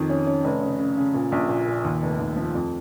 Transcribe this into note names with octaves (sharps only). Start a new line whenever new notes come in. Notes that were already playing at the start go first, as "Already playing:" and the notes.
Already playing: F2 D#3
C#4
C#4
F1
C#3
C#3
C#3
A#2
A#1
A#2
A#2
D#2
F1
D#2
F3
F2